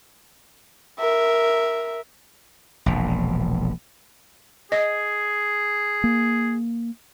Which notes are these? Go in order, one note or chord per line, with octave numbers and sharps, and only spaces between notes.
A#4 E5
E1 A#1
G#4 D#5
A#3